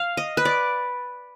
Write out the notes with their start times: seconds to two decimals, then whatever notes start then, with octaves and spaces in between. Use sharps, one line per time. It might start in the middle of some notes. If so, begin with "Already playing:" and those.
Already playing: F5
0.17 D#5
0.37 B4
0.45 D5